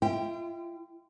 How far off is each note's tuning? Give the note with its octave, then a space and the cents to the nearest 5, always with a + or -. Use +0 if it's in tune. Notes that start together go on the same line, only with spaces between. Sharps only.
F4 -40 E5 -25 G5 +0